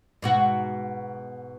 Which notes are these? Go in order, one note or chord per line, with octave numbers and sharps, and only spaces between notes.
G#2 B2 F#4